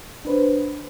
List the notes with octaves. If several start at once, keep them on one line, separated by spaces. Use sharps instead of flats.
D4 B4 C5